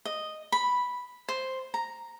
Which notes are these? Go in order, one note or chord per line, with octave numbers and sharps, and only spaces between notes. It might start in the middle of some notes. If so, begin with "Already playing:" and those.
D#5
B5
C5
A#5